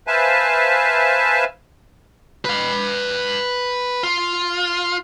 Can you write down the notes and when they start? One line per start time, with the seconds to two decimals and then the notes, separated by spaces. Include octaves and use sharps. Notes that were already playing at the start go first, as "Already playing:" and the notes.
0.07 B4 C5 E5 F5 G#5 A5
2.45 B4 F5
4.03 F4